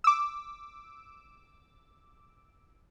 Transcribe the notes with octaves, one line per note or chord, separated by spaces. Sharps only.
D6 E6